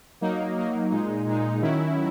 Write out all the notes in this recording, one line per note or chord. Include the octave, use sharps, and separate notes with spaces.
F#3 A#3 D#4
F#3 A#3 D#4
A#2 G#3 D#4
A#2 G#3 D#4
D#3 F#3 C#4 E4